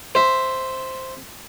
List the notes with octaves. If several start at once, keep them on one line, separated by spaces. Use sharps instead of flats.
C5 E5